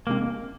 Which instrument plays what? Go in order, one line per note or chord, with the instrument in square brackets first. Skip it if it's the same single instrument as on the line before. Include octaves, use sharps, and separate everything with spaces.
[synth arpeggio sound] C3 G#3 C4 [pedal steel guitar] A#3